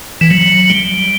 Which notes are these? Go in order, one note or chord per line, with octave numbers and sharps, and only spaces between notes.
E3
F#3
G3